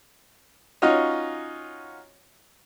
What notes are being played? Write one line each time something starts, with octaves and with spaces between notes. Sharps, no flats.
C#4 D#4 F4 F#4 C#5 D#5